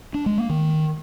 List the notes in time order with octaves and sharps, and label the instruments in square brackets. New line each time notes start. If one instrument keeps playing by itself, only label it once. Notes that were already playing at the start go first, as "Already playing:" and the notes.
[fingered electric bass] D4
G#3
A#3
D#3